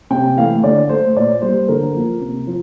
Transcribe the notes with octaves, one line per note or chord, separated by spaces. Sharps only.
C3 G5
E3 A3 F5
D3 D5
A3 C5
A#2 D5
G3 A#3 C5
D3 A#4
F3 A#3
C3
F3